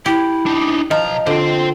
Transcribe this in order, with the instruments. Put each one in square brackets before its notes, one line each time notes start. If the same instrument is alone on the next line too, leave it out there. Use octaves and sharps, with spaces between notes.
[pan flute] E4 [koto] G4
[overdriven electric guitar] D4 D#4
[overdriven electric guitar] B1 A#5 [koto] F3 [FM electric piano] D#5
[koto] D3 [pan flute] F4 [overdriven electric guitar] C5 G5